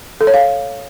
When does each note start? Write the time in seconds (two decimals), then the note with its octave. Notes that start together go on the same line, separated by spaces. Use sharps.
0.21 A4
0.27 C#5
0.34 F5